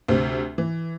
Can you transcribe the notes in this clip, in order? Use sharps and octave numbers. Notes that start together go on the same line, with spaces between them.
D2 C3 C4
E3